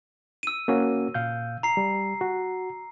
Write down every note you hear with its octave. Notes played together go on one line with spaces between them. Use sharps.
E6 D#7
A#3 C#4 F#4
A#2 F5 G6
A#5 C7
G3
F#4